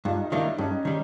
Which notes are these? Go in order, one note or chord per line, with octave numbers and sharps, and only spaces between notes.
G2 D#4 F4
D#4
D#3 G3 A#3 D4 E4
G2 C#4 D#4
D#3 G3